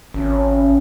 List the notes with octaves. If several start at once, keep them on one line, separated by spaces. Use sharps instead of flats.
G#1 C#4